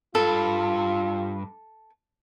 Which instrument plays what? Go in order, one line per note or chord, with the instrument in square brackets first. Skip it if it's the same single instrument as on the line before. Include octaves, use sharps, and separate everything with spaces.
[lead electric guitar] G2 [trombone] F4 [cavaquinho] A4